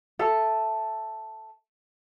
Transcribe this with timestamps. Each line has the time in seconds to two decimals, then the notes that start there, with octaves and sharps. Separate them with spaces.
0.19 A4 E5